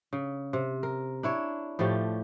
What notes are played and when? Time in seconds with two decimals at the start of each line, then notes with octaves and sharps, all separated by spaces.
0.13 C#3
0.53 C3
0.83 A#4
1.23 D4 E4 C#5
1.79 A2 F3 A3 G4